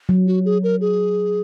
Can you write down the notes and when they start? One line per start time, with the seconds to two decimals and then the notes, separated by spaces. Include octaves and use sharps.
0.09 F#3
0.27 F#4
0.45 G#4
0.63 A#4
0.81 G#4